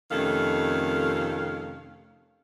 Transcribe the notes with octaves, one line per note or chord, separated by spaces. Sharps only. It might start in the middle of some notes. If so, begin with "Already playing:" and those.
F2 C3 D#3 A3 C#4 F5